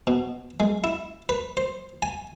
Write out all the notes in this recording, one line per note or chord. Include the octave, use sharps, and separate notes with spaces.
B2
G#3
E4
B4
C5
G#5